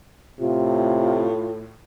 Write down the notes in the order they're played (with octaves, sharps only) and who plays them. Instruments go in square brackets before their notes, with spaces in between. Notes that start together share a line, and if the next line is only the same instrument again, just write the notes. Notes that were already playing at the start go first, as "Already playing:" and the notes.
[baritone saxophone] A2 [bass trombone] C3 [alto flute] F4